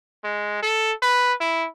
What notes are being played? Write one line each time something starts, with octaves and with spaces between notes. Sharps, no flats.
G#3
A4
B4
E4